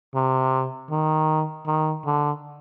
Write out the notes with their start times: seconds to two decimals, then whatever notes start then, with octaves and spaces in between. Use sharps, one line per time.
0.14 C3
0.91 D#3
1.66 D#3
2.05 D3